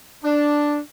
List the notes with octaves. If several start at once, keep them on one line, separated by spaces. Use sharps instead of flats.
D4